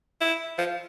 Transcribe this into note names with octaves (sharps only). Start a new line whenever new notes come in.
E4
F3